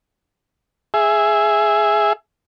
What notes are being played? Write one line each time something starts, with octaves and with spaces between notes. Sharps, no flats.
G#4 E5